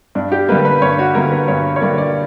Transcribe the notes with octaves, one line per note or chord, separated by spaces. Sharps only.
G2 D4
G4
D3 G3 A#3 B4
B4
G2 C#5
F#4
D3 G3 A#3 A#4
B4
G2 C#5
C#5
D3 G3 A#3 D5
D5